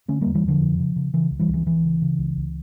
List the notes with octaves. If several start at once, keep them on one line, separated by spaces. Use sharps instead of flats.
D3 A3 C#4
E2 G3 A#3
E3 G3
E2 D3 F3
F2
C#3
C#3
C#3 E3
C#2
E3 G3
C#2
E3
C#2 E3
C#3
C#3
C#2
C#2